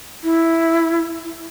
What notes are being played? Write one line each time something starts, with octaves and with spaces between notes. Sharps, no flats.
E4